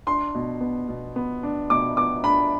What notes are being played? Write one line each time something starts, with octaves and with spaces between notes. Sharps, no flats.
D4 C6
B2
B3
B2
B3
D4
B2 D6
B3 D6
D4 B5